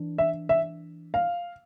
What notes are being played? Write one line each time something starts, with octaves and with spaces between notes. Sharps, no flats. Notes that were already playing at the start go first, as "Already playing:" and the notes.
Already playing: E3 D4
E5
E5
F5